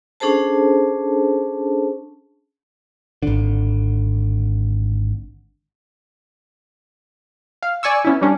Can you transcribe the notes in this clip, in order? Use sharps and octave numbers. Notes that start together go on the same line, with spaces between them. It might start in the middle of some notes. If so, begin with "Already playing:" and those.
C#4 D4 G#4 A4 C5 A5
G#1 D3
F5
D5 G#5 C#6 E6
B3 C#4 E4
G3 C#4 D4